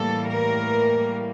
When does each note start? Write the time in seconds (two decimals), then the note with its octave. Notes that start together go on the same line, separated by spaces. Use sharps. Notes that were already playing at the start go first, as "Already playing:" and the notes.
Already playing: A2 E3 G3 A#3 A4
0.28 A#4